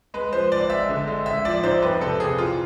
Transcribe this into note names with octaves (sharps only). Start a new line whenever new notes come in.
G#3 B4
F3 C5
G#1 D5
G#3 E5
D3
G#3
A1 E5
F3 D5
G#2 C5
F2 B4
C3 A4
C3 G#4
E3 F4